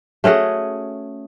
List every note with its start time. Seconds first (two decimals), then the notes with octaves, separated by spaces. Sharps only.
0.24 A3 C#4 F#4 G#4